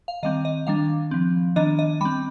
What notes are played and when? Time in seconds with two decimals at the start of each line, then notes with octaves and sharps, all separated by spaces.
0.08 F5
0.23 D#3 G3 C4 D#5
0.45 D#5
0.67 D#3 G3 D4 F5
1.11 F3 C4
1.56 D#3 B3 D4 D#5
1.79 D#5
2.01 G3 C4 B5